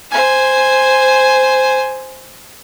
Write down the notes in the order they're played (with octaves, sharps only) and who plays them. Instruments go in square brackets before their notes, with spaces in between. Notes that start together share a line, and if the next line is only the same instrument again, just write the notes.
[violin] C5 G#5